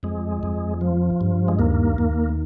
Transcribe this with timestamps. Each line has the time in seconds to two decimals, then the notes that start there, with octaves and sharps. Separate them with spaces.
0.03 F2 G#3
0.43 F2
0.81 F3
1.21 G2
1.48 G#3
1.59 D#2 A#3
1.98 D#2